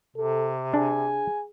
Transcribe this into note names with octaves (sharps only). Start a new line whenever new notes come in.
C3 A4
D4 G#4 G#5